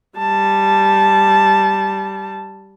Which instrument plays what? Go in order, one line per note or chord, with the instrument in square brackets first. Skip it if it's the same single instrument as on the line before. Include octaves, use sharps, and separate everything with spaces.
[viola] G3 A5